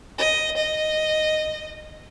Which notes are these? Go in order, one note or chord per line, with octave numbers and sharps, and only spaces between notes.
D#5
D#5